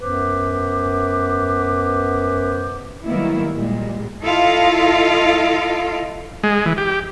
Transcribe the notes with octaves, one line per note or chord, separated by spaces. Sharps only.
F#2 B3 B4 C5 D6
D#3 F#3 G3 A#3 B3 E4
A#2 G3 G#3
E4 F4 A4 D#5 F5
G#3
E3
G4